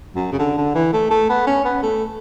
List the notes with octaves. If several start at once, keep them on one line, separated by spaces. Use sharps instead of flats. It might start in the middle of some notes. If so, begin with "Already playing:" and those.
F#2
C#3
D3
D3
E3
A3
A3
B3
C#4
B3
A3